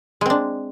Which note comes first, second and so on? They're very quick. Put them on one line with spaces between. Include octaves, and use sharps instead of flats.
G#3 C4 D4